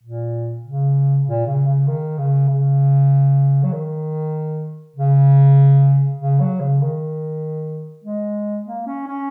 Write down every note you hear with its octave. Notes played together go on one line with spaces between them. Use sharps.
A#2
C#3
A#2
C#3
C#3
D#3
C#3
C#3
F#3
D#3
C#3
C#3
F#3
C#3
D#3
G#3
A#3
C#4
C#4